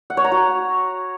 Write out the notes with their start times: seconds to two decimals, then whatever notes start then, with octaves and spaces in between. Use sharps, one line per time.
0.10 F#5
0.17 C#5
0.24 A#5
0.32 F#4